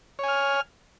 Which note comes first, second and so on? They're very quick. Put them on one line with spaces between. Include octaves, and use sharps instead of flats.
C#5 G#5 F6